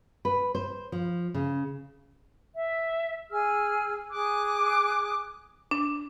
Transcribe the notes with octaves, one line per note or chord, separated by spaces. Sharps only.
B4
C5
F3
C#3
E5
G#4 E6 F6
G#4 D6 D#6 F#6
D4